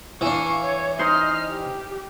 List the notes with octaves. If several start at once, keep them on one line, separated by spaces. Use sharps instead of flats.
E3 D4 F5 C#6
C#5
D#4 C5 D#5 F6
G4